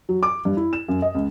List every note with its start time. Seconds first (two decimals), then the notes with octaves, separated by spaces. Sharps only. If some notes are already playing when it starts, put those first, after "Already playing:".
0.09 F#3
0.23 D6
0.45 G2
0.57 E4
0.73 E7
0.88 F#2
1.02 D#5
1.15 C#2